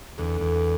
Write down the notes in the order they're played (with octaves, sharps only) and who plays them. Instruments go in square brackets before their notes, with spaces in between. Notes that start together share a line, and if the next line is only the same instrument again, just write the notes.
[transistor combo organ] E2 [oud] D3
[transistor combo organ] E2